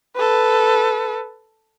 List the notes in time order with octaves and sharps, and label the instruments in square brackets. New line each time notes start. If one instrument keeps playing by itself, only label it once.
[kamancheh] A4 B4